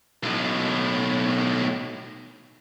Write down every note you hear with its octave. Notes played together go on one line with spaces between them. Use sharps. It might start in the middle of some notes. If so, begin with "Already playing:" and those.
B1 A2